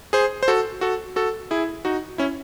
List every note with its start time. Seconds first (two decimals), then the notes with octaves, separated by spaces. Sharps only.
0.13 G#4 C5
0.43 C5
0.48 F#4 A4
0.81 F#4 A4
1.16 F#4 A4
1.51 E4 G#4
1.85 D#4 F#4
2.18 C#4 E4